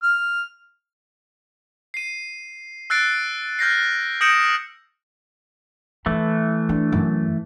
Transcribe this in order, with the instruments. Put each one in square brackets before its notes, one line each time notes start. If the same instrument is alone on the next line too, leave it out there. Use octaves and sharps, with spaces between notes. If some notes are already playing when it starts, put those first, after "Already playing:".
[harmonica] F6
[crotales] C7 D#7
E6 F#6 A6 C7 D7
F6 G6 A#6 C7
D#6 G6 A#6 C#7 D7 E7
[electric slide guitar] E3 A3 [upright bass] E4
[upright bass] D4
F#2